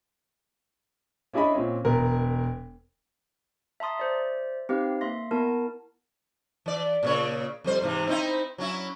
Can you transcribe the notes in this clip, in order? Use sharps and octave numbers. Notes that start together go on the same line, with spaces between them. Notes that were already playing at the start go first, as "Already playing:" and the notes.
C#4 D4 E4 G#4 D#5 B5
A#2 C4 C#4
E1 B3 A#4
E5 A5 A#5 C6 D#6 A6
C5 D5 E5
C4 D#4 G4 B4 F5
A#3 E5 C6 A#6
B3 E4 A#4 A5
E3 D5
A#2 C#3 C#5
F2 G3 C5
G#2 C3 E3
C4 D#4 E4
F#3 C#4 E4